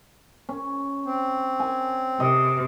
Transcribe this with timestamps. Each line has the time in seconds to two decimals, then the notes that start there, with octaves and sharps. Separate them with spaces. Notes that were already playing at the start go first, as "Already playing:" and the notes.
0.49 C#4
1.05 C4
1.60 G#5
2.20 C3 D#5